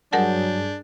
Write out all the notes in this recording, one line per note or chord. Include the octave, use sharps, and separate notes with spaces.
G2 F#3 D4 G#4 A#4 F#5 A5 G6